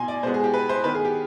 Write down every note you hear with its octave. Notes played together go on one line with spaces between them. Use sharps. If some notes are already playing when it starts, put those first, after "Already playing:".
Already playing: B2 G#5 C6
D5
B2 G#3 B3 C5
G#4
G4
B4
C5
D#3 B3 B4
G#4
G4